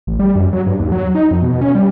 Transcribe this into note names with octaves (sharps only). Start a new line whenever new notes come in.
A1
G3
F#2
F#3
G2
D#2
F#3
D#4
F2
B2
C#4
G3